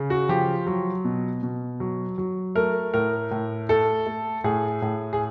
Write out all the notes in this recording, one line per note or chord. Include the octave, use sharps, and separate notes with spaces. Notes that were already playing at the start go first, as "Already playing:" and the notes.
Already playing: C#3
F#4
F3 G4
F#3
B2
B2
F#3
F#3
A3 A#4
A2 A#4
A2
A3 A4
A3
A2 G#4
A2
G#4